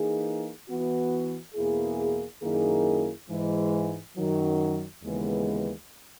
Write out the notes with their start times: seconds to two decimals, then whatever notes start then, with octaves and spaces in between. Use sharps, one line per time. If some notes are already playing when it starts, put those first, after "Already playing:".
Already playing: E3 A#3 D#4 G#4
0.68 E3 B3 F#4
1.55 E2 B2 A#3 E4 G#4
2.42 F#2 D#3 A#3 E4 G#4
3.28 G#2 E3 G#3
4.15 F#2 D#3 F#3
5.02 D#2 C#3 E3 G#3 B3